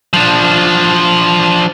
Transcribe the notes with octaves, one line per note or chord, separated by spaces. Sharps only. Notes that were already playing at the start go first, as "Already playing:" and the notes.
F3 D4